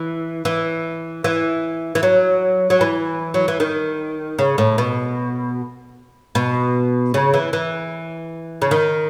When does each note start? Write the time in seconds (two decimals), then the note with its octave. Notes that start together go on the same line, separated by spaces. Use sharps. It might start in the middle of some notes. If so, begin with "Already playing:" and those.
Already playing: E3
0.45 E3
1.24 E3
1.95 E3
2.03 F#3
2.70 F#3
2.81 E3
3.34 F#3
3.48 E3
3.60 D#3
4.39 C#3
4.58 A2
4.78 B2
6.35 B2
7.14 C#3
7.33 E3
7.53 E3
8.62 C#3
8.71 D#3